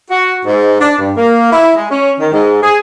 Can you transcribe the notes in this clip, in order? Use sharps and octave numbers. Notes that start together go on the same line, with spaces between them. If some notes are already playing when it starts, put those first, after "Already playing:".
F#4
G#2
D4
G2
A#3
E4
G#3
C#4
D#3
G#2
G#4